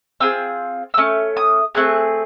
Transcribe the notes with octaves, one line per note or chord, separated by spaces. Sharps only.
C4 F4 G#4 E6
E6
A3 C#4
D#6
A3 C4 G#4 F#6